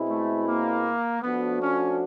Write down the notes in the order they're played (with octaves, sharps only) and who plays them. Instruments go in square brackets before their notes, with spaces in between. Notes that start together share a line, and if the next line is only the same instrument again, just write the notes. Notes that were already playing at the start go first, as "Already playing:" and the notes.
Already playing: [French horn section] B2 G#3 C4 E4
[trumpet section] A3
A#3
[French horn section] F3 A3 D4 F#4 [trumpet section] B3
[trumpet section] C#4